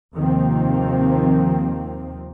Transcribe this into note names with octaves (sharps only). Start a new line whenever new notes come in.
D#2 C3 D#3 F3 A#3 C4